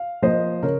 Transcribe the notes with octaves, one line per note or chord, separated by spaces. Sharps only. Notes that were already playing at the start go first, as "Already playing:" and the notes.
Already playing: F5
F3 A#3 C5 D#5
C#3 A#4 C#5